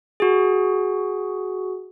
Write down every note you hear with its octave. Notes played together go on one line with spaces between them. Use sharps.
F#4 G#4